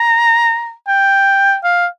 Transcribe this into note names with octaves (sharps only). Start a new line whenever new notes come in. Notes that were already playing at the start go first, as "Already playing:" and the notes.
Already playing: A#5
G5
F5